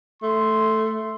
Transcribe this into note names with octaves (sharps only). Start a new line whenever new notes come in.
A3 C6